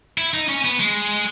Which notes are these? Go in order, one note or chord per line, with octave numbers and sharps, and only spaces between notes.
E4
D#4
C#4
B3
G#3